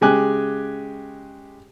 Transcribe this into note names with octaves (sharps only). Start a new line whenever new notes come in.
C#3 G#3 G4 G#5 D6 F#6